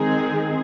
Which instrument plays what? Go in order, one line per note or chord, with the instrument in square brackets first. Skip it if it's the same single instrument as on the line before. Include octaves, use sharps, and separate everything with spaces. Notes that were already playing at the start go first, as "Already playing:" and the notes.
Already playing: [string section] D#3 G#3 C4 D#4 G#4